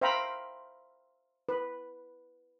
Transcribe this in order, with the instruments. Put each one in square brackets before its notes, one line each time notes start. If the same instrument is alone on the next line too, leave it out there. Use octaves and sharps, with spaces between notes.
[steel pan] C5 E5 F5 G5 A#5 B5
B4